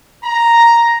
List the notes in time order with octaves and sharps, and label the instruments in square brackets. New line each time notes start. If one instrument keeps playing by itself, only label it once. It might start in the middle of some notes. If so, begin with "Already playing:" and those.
[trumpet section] A#5